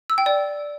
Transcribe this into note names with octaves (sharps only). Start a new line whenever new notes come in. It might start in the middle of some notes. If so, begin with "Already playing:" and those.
E6
G5
D5